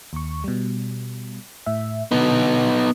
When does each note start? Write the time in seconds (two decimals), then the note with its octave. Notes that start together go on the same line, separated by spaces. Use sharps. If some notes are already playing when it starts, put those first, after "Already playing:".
0.13 D#2 C#6
0.44 B2 G3
1.66 A2 E5
2.11 B2 D3 B3 D#4